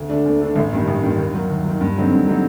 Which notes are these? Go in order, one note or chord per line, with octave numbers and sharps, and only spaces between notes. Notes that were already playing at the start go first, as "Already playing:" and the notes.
Already playing: D2
D3 A3 D4
D2
D3 A3 D4
A1
G2 D#3 G3
A1
G2 D#3 G3
D#2
D#3 F#3
D#2
D#3 F#3
G2
D3 F#3 C4 D#4
G2
D3 F#3 C4 D#4